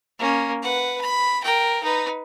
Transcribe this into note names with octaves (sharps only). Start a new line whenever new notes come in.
A#3 C#4
B4 F#5
B5
A#4 G5
D#4 B4